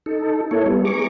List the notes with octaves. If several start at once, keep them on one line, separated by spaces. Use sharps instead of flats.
D#4 A4
A#3 E4 A4 C#5
G3 B3
G#4 A#5 C#6 D6